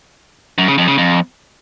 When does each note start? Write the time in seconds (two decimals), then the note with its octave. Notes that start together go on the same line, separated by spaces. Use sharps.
0.58 F#2
0.68 C#3
0.78 F2
0.88 C#3
0.98 F2